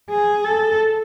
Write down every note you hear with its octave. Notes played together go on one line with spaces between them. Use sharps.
G#4
A4